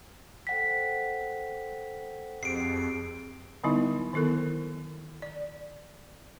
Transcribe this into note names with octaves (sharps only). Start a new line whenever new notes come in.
A4 C5 F#5 G5 B6
F2 C4 G4 G#4 C7 D7
D3 F#3 G3 B3 D#4 E4
D#3 B3 E4 A4 A#4
D5